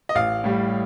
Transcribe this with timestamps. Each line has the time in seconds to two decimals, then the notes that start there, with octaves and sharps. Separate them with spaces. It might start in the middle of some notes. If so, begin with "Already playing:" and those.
0.09 D#5
0.15 A1 F5
0.44 A2 G3